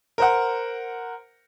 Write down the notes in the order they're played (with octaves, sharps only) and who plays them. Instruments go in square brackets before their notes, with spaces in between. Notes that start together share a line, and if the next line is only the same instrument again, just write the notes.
[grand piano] A#4 C5 F#5